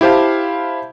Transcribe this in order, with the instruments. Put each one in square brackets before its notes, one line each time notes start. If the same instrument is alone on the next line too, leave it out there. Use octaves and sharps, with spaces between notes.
[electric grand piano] E4 G4 C5 F5 A5